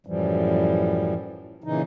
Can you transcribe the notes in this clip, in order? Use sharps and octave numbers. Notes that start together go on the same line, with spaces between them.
F#2 A2 E3 F3 G3
A#2 C#3 E3 D#4